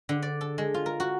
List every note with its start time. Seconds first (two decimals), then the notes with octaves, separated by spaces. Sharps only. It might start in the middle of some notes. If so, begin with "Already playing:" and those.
0.09 D3
0.22 D5
0.41 A4
0.58 G#3
0.74 F4
0.86 A#4
1.00 F#4